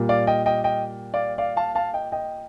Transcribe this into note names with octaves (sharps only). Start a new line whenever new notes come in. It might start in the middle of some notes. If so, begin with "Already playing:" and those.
Already playing: A#2 G3 A#3
D5 F5
D#5 G5
D#5 G5
D#5 G5
D5 F5
D5 F5
F5 A5
F5 A5
D#5 G5
D#5 G5